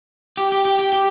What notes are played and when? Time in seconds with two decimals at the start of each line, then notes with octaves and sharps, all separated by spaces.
0.37 G4
0.52 G4
0.65 G4
0.79 G4
0.93 G4